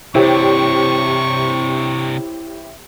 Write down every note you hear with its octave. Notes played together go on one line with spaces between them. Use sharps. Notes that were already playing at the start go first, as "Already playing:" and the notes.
C3 C4 D4 E4 G4 C#5 C#6